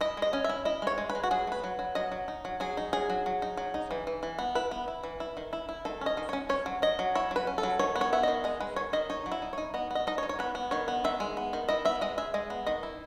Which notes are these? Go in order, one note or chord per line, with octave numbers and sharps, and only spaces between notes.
E4 D#5
G#3 D#5
C#4
E5
E4
E4 D#5
G#3 C#5
G#3
B4
G#3
F#4
F#3 G#4
A3 B4
F#3
F#3
F#3 D#5
F#3
D#4
F#3
F#3 G#4
D#4
F#3 G#4
F#3
F#3
D#4
F#3
D#4
E3
E3
E3
B3
E4 B4
B3
E4
E3
E4
D#3
E4
E4
D#3 A4
C#4 D#5
D#3
C#4 C#5
C#4 C#5
F#3
F#3 D#5
F#3
E4 C#5
F#3 B4
C#4
A4
F#3
D#3 C#5
B3
C#5
B3 E5
D#3 D#5
G#3 D#5
G#3 B4
D#3 C#5
D#3 D#5
D#4 C#5
F#3
E4
D#4
D#4 C#5
B3 D#5
B3 D#5
D#4 D#5
C#5
D#4
C#5
B3 B4
B3
D#3 C#5
B3
D#3 E5
G#3
B3
D#3
E4 D#5
B3 E5
G#3 D#5
G#3 E5
G#3 D#5
B3
D#3 D#5
E4